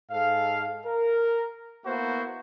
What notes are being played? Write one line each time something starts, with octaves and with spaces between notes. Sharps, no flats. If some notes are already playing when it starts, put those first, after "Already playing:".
G#2 A4 F5
A#4
A#3 B3 E4 F#4 C5